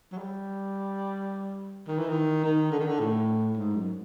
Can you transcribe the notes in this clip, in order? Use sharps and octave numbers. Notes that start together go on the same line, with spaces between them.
F#3
G3
D#3
E3
D#3
D#3
D3
D#3
D3
A2
G#2
F#2